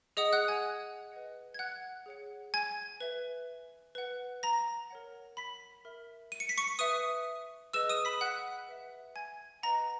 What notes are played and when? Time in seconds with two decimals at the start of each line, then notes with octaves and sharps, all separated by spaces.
0.17 G#4 D#5 F#5 D#6
0.33 F#5 F#6
0.48 G#5 G#6
1.12 B4 D#5 F#5
1.54 G#6
1.59 F#5 F#6
2.06 G#4 C#5 F#5
2.54 G#5 G#6
3.00 B4 E5
3.95 B4 F#5
4.43 A#5 A#6
4.90 A#4 C#5 F#5
5.37 B5 B6
5.85 A#4 E5
6.32 D#7
6.40 C#7
6.49 B6
6.58 C#6 C#7
6.79 B4 E5 D#6 D#7
7.73 G#4 B4 D#5 E6 E7
7.89 D#6 D#7
8.05 B5 B6
8.21 F#5 F#6
8.69 B4 E5
9.16 G#5 G#6
9.63 B4 D#5 F#5 A#5 A#6